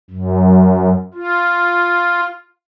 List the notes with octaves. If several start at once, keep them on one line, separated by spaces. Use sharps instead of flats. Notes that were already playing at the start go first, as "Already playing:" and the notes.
F#2
F4